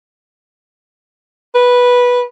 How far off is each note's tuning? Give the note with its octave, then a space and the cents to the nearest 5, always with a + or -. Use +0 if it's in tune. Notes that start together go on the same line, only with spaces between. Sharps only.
B4 -10